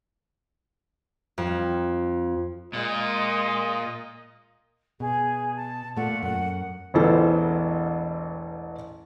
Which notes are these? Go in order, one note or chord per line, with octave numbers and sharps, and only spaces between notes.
F2
A#2 G#3 D#5
B2 G#4
A5
A#2 A3 F#5
F#2 F#5
E1 A1 E3 A4 C5